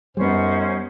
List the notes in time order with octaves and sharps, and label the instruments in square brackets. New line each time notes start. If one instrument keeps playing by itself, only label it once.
[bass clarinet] F#2 [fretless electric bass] G3 B3 [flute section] C#4 D#4 C5